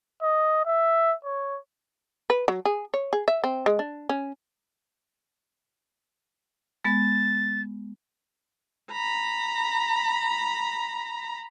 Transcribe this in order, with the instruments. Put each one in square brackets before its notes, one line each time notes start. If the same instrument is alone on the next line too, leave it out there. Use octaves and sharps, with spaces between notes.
[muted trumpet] D#5
E5
C#5
[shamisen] B4
F#3
G#4
C#5
G#4
E5
C4
G#3
D4
C#4
[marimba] G#3 B3 [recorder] A6
[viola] A#5 B5